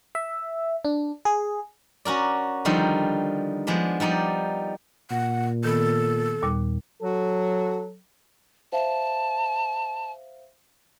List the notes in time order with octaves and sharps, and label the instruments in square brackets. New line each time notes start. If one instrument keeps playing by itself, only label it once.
[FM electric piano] E5
D4
G#4
[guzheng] C#4 F#4 A#4 D5
D3 D#3 F3 G3 D#4 F4
F3 G#3 B3 D4
F3 G3 D#4 D5
[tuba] A#2 [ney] F#5
[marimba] D#3 B3 [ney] A4
[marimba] D#2 A#2 G3
[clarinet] F#3 [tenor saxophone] F#4 [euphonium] A4
[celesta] C5 E5 F5 [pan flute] A5